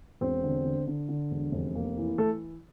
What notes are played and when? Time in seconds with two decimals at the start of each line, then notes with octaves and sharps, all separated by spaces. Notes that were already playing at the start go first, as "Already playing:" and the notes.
0.21 E1 C4 C5
0.44 D3
0.65 D3
0.87 D3
1.09 D3
1.31 E1
1.52 F1
1.75 A#3
1.97 E3
2.18 A3 A4